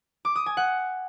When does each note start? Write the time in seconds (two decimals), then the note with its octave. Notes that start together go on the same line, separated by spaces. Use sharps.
0.25 D6
0.36 D#6
0.46 G#5
0.57 F#5